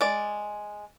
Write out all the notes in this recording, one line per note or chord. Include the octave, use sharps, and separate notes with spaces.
G#3 D5